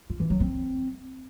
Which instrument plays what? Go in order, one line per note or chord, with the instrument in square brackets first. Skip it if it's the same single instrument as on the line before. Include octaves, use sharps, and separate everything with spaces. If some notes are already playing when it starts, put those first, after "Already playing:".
[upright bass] F4
E3
F#3
C4